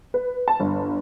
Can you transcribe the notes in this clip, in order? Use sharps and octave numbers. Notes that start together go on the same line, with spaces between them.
B4
A5
G1